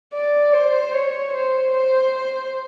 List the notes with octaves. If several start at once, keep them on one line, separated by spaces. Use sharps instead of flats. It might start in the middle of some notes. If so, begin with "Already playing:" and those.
D5
C5
C#5
C5
C5